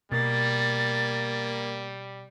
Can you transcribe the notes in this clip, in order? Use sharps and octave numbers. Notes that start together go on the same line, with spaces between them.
B2 G3 A#3 A6